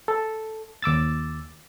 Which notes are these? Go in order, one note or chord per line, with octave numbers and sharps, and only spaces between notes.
A4
D#2 D6 E6 A6